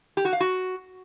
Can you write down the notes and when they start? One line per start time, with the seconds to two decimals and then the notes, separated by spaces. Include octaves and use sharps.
0.17 G4
0.25 F#4
0.33 F5
0.40 F#4